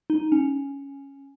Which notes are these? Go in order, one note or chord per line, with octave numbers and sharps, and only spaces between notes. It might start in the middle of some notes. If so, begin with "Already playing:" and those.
D#4
C#4